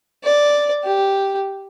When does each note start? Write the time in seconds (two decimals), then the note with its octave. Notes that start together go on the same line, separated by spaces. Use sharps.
0.24 D5
0.84 G4